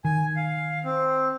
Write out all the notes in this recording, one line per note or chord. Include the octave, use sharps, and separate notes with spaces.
D#3 G#5
F5
C4